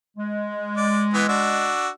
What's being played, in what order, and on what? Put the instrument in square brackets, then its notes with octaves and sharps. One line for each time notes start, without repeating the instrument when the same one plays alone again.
[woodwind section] G#3
[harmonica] D5
E3 B3
D4 F#4 E6